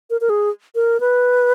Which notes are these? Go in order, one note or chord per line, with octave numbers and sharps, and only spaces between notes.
A#4
A#4
G#4
A#4
B4